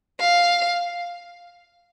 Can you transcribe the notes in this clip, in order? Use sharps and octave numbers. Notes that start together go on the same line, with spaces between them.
F5